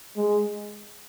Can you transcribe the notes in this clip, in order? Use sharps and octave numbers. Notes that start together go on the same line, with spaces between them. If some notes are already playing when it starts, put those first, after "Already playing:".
G#3